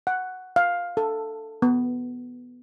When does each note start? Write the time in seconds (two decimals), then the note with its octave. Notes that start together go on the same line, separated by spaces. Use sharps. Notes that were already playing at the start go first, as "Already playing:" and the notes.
0.07 F#5
0.56 F5
0.97 A4
1.62 B3